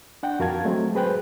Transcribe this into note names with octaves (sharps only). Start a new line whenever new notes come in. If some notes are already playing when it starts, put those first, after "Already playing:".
D4 F#5 G5
F2 F#4 A#4 F5 A5 G#6
F#3 G#3 A3 C4
G#4 B4 C5 G5 F#6